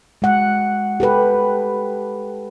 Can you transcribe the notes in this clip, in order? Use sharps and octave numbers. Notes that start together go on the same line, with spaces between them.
G#3 F#5
G4 A4 B4